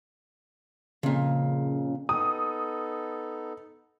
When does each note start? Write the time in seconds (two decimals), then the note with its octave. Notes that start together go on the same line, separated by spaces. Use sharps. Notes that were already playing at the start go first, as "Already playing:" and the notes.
1.03 F2 A#2 C#3
2.09 B3 D#4 A4 D#6